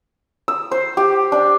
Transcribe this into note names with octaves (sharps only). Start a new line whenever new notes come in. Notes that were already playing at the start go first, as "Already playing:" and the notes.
E6
C5
G4
D4